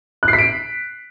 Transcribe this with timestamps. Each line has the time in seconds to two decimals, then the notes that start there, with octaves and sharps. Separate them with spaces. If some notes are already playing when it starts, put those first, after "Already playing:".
0.23 F#6
0.28 C7
0.33 B6
0.38 D7